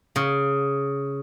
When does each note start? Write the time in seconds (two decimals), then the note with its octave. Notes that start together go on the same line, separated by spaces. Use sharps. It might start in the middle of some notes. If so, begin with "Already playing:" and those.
0.16 C#3